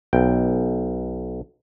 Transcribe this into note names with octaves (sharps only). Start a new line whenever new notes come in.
B1 G5